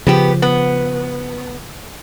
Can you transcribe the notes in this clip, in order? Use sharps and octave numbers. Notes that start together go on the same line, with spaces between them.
C#3 F3 B3 G4
B3